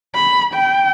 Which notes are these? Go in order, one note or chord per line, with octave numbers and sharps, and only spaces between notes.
B5
G5